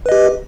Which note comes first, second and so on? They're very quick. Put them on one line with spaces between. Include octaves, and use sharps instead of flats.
B4 D#5 G4